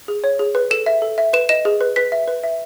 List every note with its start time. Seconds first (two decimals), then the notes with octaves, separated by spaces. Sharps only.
0.08 G#4
0.24 C#5
0.39 G#4
0.55 B4
0.71 A4 E7
0.86 E5
1.02 A4
1.18 E5
1.33 B4 E7
1.49 D#5 E7
1.65 G#4
1.81 B4
1.96 B4 B6
2.12 E5
2.28 B4
2.43 E5